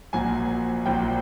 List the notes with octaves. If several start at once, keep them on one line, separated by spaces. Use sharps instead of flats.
A#1 A#2 F#3 G#5
A#1 A#2 F#3 G5